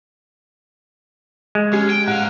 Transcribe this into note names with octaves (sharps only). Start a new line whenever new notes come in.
G#3
C#4 G4
G5
G#2 F5 F#5 F#6